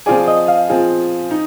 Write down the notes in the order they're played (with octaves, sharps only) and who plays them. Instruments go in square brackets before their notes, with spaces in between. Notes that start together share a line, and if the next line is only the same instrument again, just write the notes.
[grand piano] F3 C4 F4 G#4 [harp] D5
[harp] D#5
F5
[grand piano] F3 C4 F4 G#4
D#4